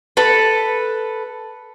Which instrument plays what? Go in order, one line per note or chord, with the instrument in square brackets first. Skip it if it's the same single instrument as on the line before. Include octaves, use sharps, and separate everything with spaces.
[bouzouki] A4 B4